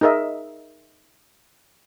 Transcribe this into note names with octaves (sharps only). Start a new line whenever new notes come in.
D#4 G#4 A#4 D#5 E5